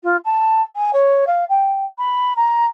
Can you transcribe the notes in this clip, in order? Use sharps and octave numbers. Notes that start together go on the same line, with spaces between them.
F4
A5
G#5
C#5
F5
G5
B5
A#5